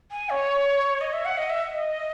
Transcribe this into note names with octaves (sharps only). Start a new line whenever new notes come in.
G#5
C#5
D#5
E5
F#5
D#5
E5
D#5